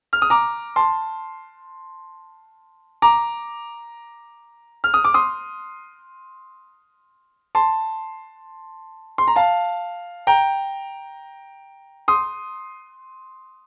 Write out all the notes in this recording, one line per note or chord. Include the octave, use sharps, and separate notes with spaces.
F6
D#6
A#5 D6
A5 C6
A#5 D6
F6
D#6
D6
C6 D#6
A5 C6
C6
A#5
F5 A5
G5 A#5
C6 D#6